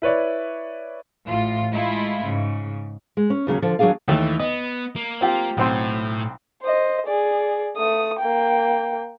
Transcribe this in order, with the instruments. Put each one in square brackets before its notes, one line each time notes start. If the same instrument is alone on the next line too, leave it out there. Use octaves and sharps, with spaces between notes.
[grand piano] E4 B4 C#5 D5
[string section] A1 A2 F4
G#3 A3 E4 F4
G#2 C#3
[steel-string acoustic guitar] G#3
C#4
D#2 C#3 F#3 C#4
D3 F3
D#2 F#3 G#3 D4 G#4 F5
[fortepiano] D#2 A3 [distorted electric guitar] E3
[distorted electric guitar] B3 [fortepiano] D#5
[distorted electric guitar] A#3
[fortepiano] C4 F4 G4
[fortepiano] B1 C4 C6 [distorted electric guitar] A2
[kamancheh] C5 D#5
G#4 D5
A3 D#6
A#3 G5